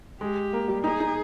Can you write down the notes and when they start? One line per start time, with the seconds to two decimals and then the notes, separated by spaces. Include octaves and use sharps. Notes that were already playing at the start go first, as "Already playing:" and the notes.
0.21 G#3 G4
0.53 A#3
0.68 G3
0.84 D#4 G#4
1.00 D#4